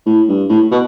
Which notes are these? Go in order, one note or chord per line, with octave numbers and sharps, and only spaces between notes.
A2
G2
A2
B2